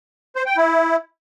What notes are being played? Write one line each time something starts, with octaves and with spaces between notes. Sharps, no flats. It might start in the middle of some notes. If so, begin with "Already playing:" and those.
C5
G5
E4